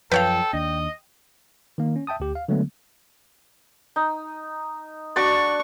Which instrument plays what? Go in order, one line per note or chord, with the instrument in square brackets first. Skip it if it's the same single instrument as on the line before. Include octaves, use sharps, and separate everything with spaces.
[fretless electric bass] F#2 F3 [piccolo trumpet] A4 [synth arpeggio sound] B4 C#5 F5 [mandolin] G5
[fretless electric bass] D#2 D4 [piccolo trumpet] D#5
[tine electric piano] D#3 A#3
C#4
E5 G5 A5 D#6
D2 G4
F5
D3 F#3 G#3 A3 B3
[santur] D#4
[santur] D4 F#4 D5 [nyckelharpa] C#6